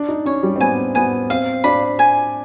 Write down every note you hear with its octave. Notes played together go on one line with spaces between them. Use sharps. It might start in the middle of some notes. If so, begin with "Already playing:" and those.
Already playing: D4
D#4
C#4 C#5
G3
C4
B3 G#5
B3 G#5
C4 F5
D4 B5
G#5